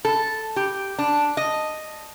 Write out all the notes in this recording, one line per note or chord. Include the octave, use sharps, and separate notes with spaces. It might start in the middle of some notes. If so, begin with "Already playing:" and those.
A4
G4
D4
D#5